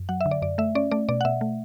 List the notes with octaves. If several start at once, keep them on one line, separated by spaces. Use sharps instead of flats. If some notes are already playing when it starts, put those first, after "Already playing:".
Already playing: F#2
F#3 F#5
E5
D3
D5
F#2 D5
A3 E5
C#4 D5
A3 D5
B2 D5
F#5
B2 E5
A3